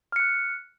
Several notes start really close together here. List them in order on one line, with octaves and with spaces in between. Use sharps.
F6 C#7 F#6